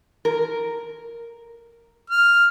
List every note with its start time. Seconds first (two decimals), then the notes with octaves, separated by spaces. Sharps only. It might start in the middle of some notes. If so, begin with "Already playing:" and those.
0.25 A#4
2.10 F6